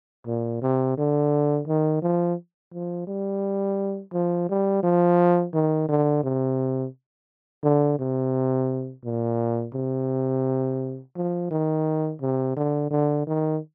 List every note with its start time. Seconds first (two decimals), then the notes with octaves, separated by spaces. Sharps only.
0.27 A#2
0.62 C3
0.98 D3
1.68 D#3
2.02 F3
2.73 F3
3.07 G3
4.13 F3
4.49 G3
4.83 F3
5.54 D#3
5.89 D3
6.24 C3
7.64 D3
7.99 C3
9.04 A#2
9.75 C3
11.16 F3
11.51 D#3
12.22 C3
12.57 D3
12.91 D3
13.27 D#3